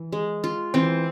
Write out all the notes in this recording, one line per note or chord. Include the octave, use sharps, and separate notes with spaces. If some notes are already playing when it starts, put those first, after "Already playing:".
Already playing: E3
G#3
F4
E3 C4